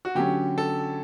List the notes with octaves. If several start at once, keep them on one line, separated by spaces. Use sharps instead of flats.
F#4
D3 F#3 C#4 G4
A4